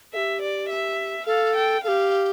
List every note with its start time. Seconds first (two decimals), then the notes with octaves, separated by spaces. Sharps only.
0.13 G4 A4 E5
0.41 D5
0.69 E5
1.26 A4 F5
1.55 G5
1.83 A4 F5
1.88 G4